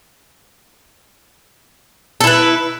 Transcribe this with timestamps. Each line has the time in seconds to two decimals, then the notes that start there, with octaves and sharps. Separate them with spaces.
2.21 A4
2.24 E4
2.27 B4